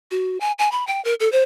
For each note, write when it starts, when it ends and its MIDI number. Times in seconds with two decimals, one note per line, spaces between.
0.11 0.38 66
0.40 0.52 80
0.59 0.71 80
0.72 0.87 83
0.87 1.03 79
1.05 1.14 70
1.20 1.30 69
1.32 1.43 72